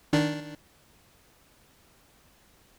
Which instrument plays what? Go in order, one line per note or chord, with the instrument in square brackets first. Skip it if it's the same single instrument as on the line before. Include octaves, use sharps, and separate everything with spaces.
[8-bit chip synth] D#3 D4